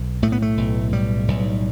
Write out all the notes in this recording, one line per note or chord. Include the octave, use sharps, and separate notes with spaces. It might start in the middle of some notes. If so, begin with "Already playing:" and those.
Already playing: B1
A2 A3
B3
A3
B1
A2 G3
B1